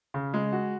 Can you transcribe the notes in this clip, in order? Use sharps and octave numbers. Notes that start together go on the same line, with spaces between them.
C#3
G#3
F#4